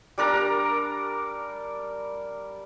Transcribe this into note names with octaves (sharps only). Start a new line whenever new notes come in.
G3 D4 A#4 A#5